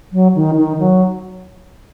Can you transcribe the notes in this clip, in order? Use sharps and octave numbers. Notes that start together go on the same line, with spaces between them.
F#3
D#3
D#3
F#3